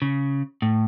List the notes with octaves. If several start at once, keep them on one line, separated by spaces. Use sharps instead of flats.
C#3
A2